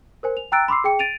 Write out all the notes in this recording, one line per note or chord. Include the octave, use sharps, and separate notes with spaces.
A#4 C5 G#5
F7
G5 A#5 E6 F#6 A6 D7
B5 C6 D6 E6 C7
G#4 G5 C#7
A6 D7 D#7 F7